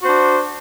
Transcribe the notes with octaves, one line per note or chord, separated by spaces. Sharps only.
D4 F#4 C5